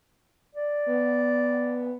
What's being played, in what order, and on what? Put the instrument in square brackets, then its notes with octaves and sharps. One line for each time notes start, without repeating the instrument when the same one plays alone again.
[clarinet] D5
[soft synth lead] B3